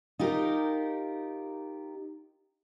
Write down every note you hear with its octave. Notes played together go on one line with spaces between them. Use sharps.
D#4 F4 G4 A#4